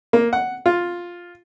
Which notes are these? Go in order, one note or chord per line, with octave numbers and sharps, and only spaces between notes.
A#3
F#5
F4